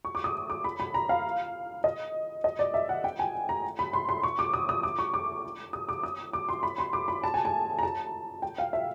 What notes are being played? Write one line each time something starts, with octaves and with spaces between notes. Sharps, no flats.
C#6
D6
D#6
D6
B5
B5
A#5
F5
D#5
D#5
D5
E5
F#5
G5
G#5
A#5
B5
C6
C6
C#6
D6
D#6
D#6
D6
C#6
D6
D#6
D6
D#6
D6
C6
B5
C6
D6
B5
A5
G#5
A5
A#5
A5
G5
F5
E5